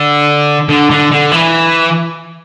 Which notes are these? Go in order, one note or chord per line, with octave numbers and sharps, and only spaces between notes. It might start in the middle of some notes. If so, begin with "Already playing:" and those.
Already playing: D3
D3
D3
D3
E3